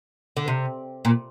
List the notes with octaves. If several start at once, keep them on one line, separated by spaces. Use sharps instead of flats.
D3
C3
A#2